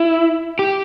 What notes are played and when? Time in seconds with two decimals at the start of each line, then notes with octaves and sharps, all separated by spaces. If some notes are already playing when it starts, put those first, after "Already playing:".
Already playing: E4
0.59 G4